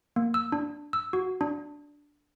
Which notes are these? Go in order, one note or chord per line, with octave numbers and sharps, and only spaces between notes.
A#3
E6
D4
E6
F#4
D4